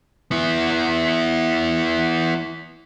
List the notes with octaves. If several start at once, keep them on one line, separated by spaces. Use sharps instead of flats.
B3 E4